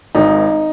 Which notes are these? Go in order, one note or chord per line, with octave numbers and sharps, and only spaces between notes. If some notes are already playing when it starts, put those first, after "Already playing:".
G#1 G#2 D#3 D#4